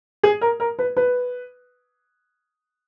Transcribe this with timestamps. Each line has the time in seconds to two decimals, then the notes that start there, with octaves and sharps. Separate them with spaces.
0.23 G#4
0.41 A#4
0.60 A#4
0.79 B4
0.97 B4